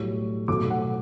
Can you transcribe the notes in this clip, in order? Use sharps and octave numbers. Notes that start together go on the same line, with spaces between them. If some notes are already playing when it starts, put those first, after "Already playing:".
Already playing: B1 A2 G3 C#6
B1 B2 A3 D6
F#5